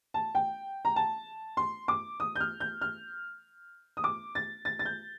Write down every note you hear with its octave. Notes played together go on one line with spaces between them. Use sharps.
A5
G5
A#5
A5
C6
D6
D#6
G6
F6
G6
F6
D#6
D6
A6
A6
A6
G6